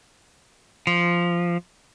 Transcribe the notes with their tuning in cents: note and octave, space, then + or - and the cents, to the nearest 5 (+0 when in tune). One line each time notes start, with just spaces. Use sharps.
F3 -10